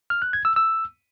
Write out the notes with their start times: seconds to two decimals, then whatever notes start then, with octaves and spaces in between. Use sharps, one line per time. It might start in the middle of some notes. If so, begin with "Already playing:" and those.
0.10 F6
0.22 F#6
0.33 G#6
0.45 E6
0.56 E6